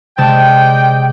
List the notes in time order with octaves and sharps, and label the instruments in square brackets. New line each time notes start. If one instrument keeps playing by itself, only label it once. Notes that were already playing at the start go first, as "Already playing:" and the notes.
[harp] C3 G#3 A5 [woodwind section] D5 D#5 G5